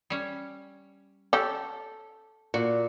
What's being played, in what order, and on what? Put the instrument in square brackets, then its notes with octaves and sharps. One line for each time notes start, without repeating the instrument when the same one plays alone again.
[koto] G3 C#4
[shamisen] C#4 G4 [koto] A4
[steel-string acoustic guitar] A#2 [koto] F#4